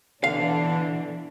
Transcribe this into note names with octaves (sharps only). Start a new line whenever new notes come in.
B2 D3 E3 D4 F5